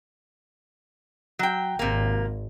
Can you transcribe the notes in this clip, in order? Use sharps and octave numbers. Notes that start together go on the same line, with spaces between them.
F#3 G5
G#1 C3 A#3